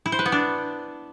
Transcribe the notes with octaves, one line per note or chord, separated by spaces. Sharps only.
E4
C5
B4
B3
D4